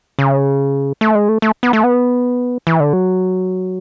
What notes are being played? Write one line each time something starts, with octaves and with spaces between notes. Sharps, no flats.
C#3
A3
G#3
A3
A3
B3
A3
B3
E3
D3
F#3